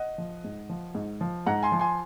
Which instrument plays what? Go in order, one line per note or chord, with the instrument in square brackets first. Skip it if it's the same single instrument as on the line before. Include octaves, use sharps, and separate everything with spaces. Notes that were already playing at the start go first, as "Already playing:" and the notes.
Already playing: [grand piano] D#5 F#5
F3
G#2
F3
G#2
F3
G#2 F#5 A#5
G#5 C6
F3
G#5 C6